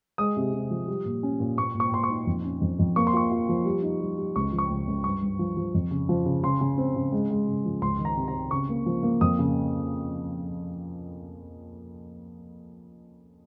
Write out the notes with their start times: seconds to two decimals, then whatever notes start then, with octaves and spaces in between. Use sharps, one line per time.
0.18 G#3 D#6
0.37 C3
0.54 C3
0.71 F3
0.87 G3
1.05 A#2
1.23 C#4
1.40 A#2
1.58 A#2 C#6
1.75 A#2
1.80 C#6
1.92 A#2 C6
2.04 C#6
2.10 D#4
2.27 F2
2.44 C#4
2.61 F2
2.79 F2
2.96 A#3 C#6
3.07 C6
3.13 F4 C#6
3.31 F4
3.49 F3
3.65 G3
3.82 D#4
4.01 G3
4.17 G3
4.36 C#2 C#6
4.52 F3
4.58 C#6
4.70 C#2
4.87 C#2
5.04 G2 C#6
5.22 G2
5.39 F3
5.57 F3
5.74 F2
5.91 C#3
6.09 F3
6.25 C#3
6.43 C#3 C6
6.61 C#3
6.78 C4
6.96 C#3
7.12 G#3
7.31 G#3
7.48 C#3
7.65 F3
7.81 C#2 C6
7.99 D#3
8.05 A#5
8.17 C3
8.28 A#5
8.34 C3
8.51 C#3 C#6
8.69 A#3
8.86 F3
9.03 A#3
9.21 F2 D#6
9.39 C#3